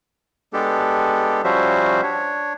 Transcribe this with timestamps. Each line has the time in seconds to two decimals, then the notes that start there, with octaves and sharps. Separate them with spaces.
0.53 G#3 B3 D4 G4 A4
1.44 F3 G3 C#4 F#4 C5 E5
2.03 D4 C#5